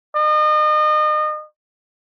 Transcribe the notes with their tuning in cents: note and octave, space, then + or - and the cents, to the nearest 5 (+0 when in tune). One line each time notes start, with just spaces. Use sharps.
D#5 -35